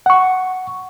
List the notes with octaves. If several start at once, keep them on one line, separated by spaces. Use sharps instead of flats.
F#5 C#6